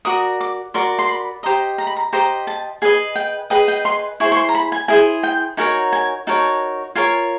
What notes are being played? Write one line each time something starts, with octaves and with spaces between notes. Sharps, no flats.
F#4 A#4 D5 D#6
D6
F#4 A#4 D5 C6
C6
B5
G4 C5 D#5 A#5
A#5
B5
A#5
G4 C5 D#5 A#5
A5
G#4 B4 D#5 G#5
G5
G#4 B4 D#5 G5
G5
C6
E4 G#4 C5 C#6
C#6
C6
A#5
B5
G#5
E4 G#4 C5 G#5
G5
D#4 F#4 A#4 C#5 G#5
G#5
D#4 F#4 A#4 C#5 A5
F4 A#4 C#5 G#5